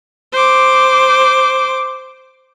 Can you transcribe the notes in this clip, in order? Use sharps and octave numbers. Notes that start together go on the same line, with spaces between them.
C5 D6